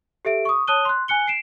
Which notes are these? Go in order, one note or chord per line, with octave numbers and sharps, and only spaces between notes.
G4 A4 E5 D7
C#6 D#6
C#5 A5 D#6 F#6 D#7 G7
C6 F#6
G#5 F#6 C#7 G7
C7 D7 E7